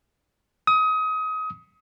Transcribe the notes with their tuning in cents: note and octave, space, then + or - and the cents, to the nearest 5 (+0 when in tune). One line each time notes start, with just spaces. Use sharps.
D#6 +25